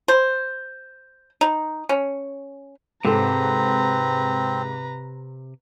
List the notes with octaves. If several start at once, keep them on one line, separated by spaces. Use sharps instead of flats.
C5
D#4
C#4
G#2 C3 C4 A4 B4 A#5